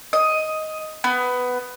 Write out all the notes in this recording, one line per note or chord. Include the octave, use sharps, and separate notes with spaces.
D#5
B3